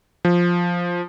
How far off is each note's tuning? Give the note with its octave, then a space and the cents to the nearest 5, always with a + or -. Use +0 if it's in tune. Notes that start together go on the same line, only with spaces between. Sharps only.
F3 +5